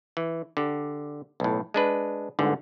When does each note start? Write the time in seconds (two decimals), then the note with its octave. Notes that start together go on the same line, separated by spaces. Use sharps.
0.17 E3
0.57 D3 G4
1.40 B1 A2
1.74 G#3 D4 B4
2.39 G1 G#2 D3